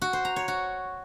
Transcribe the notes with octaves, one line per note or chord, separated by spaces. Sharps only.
F#4
C5
A#5
C#5
F#4